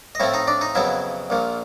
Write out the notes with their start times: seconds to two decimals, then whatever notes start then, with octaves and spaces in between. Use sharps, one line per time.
0.15 D#5
0.20 A2 F3 A3 C4 E4 E5
0.33 D#4 D#5
0.47 D4 D5
0.61 D#4 D#5
0.75 F2 C#3 F#3 B3 E4 E5
1.30 A#1 A#2 F3